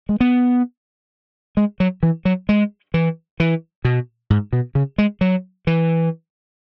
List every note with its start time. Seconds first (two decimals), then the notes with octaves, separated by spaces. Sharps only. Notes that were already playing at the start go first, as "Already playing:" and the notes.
0.09 G#3
0.20 B3
1.57 G#3
1.80 F#3
2.03 E3
2.25 F#3
2.49 G#3
2.94 E3
3.40 E3
3.85 B2
4.30 G#2
4.53 B2
4.75 C#3
4.98 G#3
5.21 F#3
5.67 E3